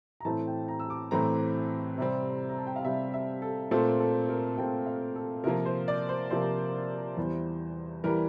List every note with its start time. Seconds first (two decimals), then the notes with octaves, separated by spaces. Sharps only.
0.20 A#5
0.25 A2 E3 A3 C4 A5
0.47 G5
0.68 A#5
0.80 E6
0.90 D6
1.11 A2 E3 A3 C4 A#5
1.98 C3 G3 C4
2.49 A#5
2.58 A5
2.67 G5
2.76 F5
2.84 C3 G3 C4 E5
3.14 E5
3.42 A4
3.71 A#2 A3 C4 A4
4.00 A4
4.29 A#4
4.57 A#2 A3 C4 G5
4.86 F5
5.16 A4
5.44 C3 F3 A#3 A#4
5.66 C5
5.88 D5
6.09 C5
6.30 C3 F3 A#3 C5
7.17 E2 E3 G3
8.04 E3 G3 A#4